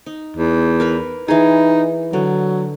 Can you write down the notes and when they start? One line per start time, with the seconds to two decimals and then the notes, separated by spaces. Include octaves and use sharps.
0.06 D#4
0.37 E2
0.80 A#4 B4 B5
1.28 E3 D#4 G#4
2.13 D3 F#3